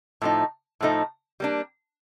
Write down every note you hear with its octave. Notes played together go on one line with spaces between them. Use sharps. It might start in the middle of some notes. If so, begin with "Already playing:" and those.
A2 F3 A3 D#4
A2 F3 A3 D#4
G3 A#3 D4